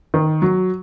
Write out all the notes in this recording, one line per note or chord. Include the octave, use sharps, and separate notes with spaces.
D#3
F#3